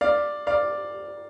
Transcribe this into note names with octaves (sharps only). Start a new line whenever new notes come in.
D5 F5
D5 F5